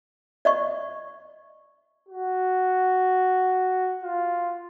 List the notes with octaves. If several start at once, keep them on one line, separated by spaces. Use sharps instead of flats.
D5 D#5 C#6
F#4
F4